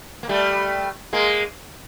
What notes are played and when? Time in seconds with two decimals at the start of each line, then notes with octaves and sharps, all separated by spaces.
0.23 A#3
0.29 G3 A3
1.13 G#3 A#3